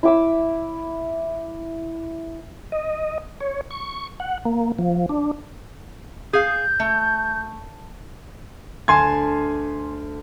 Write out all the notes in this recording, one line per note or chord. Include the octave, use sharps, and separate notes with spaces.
E4 D6 E6
D#5
C#5
C#6
F#5
A#3
F3
D4
G#4 F5 G6
A3
D2 G#5 A5 C6 G#6